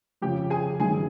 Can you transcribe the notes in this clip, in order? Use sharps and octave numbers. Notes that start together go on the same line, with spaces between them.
F2 C#3 F3 G4 G5
G#4 G#5
A1 G2 D#3 F#3 G#4 G#5